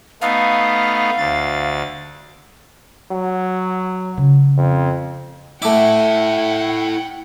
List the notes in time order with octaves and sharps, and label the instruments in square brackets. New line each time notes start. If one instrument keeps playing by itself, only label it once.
[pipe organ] A3 B3 D#4 [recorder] F5
[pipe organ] D2 A6
[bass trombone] F#3
[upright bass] C#3
[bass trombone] F2
[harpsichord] A3 D6 [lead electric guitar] E4 A4 [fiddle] F#5 G5